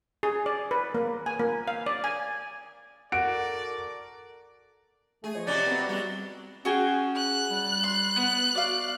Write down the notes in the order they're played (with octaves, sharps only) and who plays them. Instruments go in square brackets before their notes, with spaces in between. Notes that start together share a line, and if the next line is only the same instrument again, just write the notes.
[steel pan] G#4
D5
B4
A#3
G#5
A#3
F5
D5
G#5
[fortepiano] F#4 [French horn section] A4 A#4 [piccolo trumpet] D5 [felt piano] D7
[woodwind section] A3 [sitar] G#4
[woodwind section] F3 C#5 D#5
[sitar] C3 F#3 C#4 [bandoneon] D5
[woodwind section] B3 C4 E4
[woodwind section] G3 [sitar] G#3 F#4
[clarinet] C#4 [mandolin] F#4 G#4 G5
[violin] F#6
[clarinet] G3
[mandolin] C6
B3
[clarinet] F#4 [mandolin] D5 F5